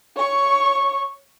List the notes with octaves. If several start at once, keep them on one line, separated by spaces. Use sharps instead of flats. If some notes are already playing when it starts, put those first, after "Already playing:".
C#5 C#6